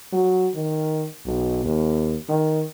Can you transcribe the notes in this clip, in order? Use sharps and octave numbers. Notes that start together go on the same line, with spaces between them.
F#3
D#3
B1
D#2
D#3